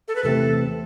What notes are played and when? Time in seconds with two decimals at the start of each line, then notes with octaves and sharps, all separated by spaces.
0.08 A4
0.15 B4
0.23 E2 C3 E3 A3 C4 A4